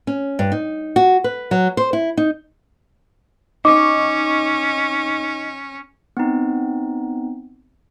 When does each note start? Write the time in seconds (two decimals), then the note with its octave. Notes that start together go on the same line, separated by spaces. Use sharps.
0.07 C#4
0.39 G2
0.52 D#4
0.96 F#4
1.24 B4
1.51 F#3
1.77 C5
1.93 E4
2.17 D#4
3.65 C#4 D#4 D#5 C#6 D6
6.17 B3 C4 D#4